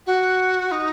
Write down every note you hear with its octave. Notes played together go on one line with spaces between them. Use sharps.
F#4
D#4